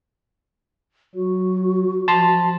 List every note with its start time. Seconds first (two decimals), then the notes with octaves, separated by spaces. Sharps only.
1.15 F#3 F#4
2.08 F3 A5 C6